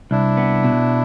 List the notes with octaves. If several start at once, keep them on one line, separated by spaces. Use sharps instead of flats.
C2 D4 E4
B3
B2